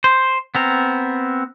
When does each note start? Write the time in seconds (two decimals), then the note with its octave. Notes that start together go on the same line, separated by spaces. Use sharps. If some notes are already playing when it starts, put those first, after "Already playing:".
0.04 C5
0.55 B3 C4 A#4